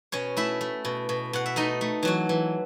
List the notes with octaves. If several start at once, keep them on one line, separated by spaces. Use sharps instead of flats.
B2 C#4 C#5
A3 E4 E5
A3
B2
B2
B2 F#5
E5
A3 D#4 D#5
A3
E3 F#3 F#4
E3